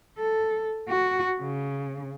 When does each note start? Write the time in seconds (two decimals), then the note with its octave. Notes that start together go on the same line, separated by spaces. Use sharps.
0.18 A4
0.89 F#4
1.41 C#3